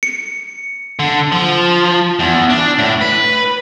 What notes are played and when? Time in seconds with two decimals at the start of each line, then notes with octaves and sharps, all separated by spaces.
0.03 C#7
0.99 D3
1.32 F3
2.19 E2
2.50 D4
2.78 A2
3.01 B4